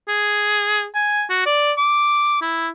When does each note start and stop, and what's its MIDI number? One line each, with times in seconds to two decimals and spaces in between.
0.08 0.86 68
0.95 1.23 80
1.30 1.41 66
1.46 1.72 74
1.78 2.40 86
2.41 2.68 64